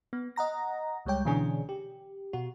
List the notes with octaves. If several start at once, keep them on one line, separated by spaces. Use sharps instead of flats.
B3
D#5 F#5 A#5 A#6
C#2 G3 G#3 C#5 G5
B2 D3 E3 C#4 D4 G#4
G4
B2 F#4